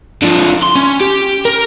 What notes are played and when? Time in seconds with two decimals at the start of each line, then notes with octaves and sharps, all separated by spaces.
0.22 D3 F3
0.62 C6
0.75 C#4
1.01 G4
1.45 A#4